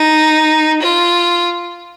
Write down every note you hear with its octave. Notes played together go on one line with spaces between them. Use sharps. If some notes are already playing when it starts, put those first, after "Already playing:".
Already playing: D#4
F4